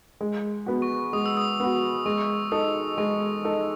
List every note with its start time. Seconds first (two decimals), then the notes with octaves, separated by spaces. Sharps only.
0.21 G#3
0.66 B3 F#4
0.82 C#6
1.13 G#3 D#6
1.26 E6
1.37 D#6
1.60 B3 F#4
2.06 G#3 C#6
2.51 D#4 A4 D#6
2.98 G#3 C#6
3.45 D#4 A4